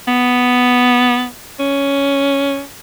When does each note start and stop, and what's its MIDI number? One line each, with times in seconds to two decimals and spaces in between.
0.07 1.27 59
1.59 2.63 61